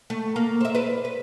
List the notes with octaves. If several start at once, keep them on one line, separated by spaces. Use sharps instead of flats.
A3
A#3
C5 E5
B4 D5
B4